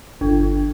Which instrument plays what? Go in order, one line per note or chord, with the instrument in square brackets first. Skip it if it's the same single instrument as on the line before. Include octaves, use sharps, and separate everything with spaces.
[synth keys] G1